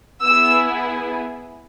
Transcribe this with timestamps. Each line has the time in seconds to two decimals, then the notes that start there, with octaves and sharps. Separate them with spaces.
0.23 B3 E4 G#4 E6